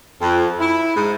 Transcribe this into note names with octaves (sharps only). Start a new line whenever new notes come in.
F2
E4
G#2